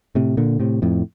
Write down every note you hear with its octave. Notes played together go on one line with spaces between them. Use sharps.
A2 C3
A#2 D3
A2 C3
F2 A2